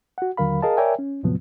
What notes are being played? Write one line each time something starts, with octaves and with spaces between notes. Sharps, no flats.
F#4 F#5
D#2 D3 F#3 A#4 F5 B5
G#4 A#4 D#5 F5 A5
A#4 C#5 D5 E5 G5 G#5
C#4
E2 A2 C3 F3 F#3 B3